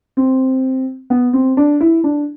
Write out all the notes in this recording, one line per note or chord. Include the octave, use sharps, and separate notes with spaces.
C4
B3
C4
D4
E4
D4